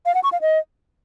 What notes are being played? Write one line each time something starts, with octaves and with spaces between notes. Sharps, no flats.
F5
F#5
C#6
F5
D#5